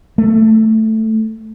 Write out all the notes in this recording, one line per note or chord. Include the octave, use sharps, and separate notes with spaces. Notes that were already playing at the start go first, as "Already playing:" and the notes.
A3